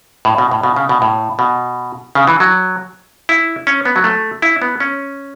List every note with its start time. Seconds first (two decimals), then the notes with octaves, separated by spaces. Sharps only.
0.25 A2
0.38 B2
0.51 A2
0.63 B2
0.76 C#3
0.89 B2
1.02 A2
1.39 B2
2.15 C#3
2.27 E3
2.40 F#3
3.29 E4
3.67 C#4
3.85 B3
3.96 F#3
4.04 A3
4.42 E4
4.62 B3
4.80 C#4